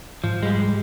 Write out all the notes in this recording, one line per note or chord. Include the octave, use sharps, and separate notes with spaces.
G#2 F3
G3 G#3